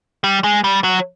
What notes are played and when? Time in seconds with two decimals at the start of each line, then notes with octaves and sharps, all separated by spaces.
0.24 G3
0.44 G#3
0.64 G3
0.84 F#3